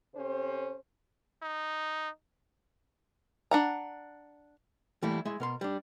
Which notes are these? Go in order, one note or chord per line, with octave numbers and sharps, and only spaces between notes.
C3 C#4 A4 C5
D#4
D4 F#5 A#5
E3 G3 A3 A#3 E4
G#3 E4 E5
B2 A#4 C6
G3 D4